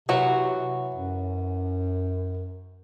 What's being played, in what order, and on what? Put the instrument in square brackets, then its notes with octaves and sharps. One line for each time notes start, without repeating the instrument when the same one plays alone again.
[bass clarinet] C3 [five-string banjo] E3 F#3 F#4
[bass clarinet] F#2